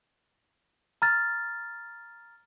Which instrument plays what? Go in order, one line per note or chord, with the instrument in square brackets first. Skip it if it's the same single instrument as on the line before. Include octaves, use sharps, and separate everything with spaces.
[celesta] A#5 F6 A6